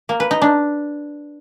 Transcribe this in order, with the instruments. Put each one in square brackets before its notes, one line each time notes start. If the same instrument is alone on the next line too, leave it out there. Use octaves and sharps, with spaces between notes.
[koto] A#3
B4
D#4
D4